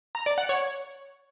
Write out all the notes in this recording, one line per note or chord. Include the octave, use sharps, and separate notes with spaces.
A#5
D5
F#5
C#5